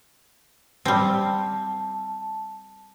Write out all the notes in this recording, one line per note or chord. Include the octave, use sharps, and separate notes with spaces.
G3 C4 A5